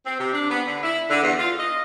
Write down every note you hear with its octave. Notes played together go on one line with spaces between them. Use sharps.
C4
C3
D4
B3
D3
E4
D3
E2
F4
D#5